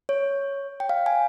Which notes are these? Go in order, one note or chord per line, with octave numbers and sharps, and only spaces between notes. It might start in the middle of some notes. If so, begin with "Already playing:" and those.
C#5
G5
F5
G#5